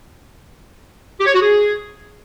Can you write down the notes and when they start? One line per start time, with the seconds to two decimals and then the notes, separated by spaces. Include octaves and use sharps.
1.19 G4
1.26 C#5
1.34 F#4
1.41 G#4